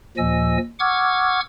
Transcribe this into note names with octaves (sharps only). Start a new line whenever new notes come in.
D#2 A#2 F3 D#5 G#5 E6
F#5 C#6 D6 E6 F6 G#6